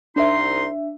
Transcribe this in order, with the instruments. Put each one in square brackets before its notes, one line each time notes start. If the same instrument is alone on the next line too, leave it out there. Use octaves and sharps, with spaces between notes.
[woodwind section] C2 D#4 C6 [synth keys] D4 E5